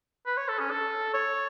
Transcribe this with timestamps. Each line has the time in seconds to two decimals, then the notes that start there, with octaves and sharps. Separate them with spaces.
0.26 B4
0.37 C#5
0.49 A4
0.59 C#4
0.70 A4
1.14 C#5